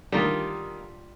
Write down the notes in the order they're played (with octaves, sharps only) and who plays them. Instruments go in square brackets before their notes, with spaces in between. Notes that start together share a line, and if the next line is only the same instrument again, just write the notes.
[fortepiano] D3 D#3 A#3 [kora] G3 F4